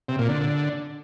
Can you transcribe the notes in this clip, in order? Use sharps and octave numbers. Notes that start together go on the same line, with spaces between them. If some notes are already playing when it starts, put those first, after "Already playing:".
C3
A#2
D3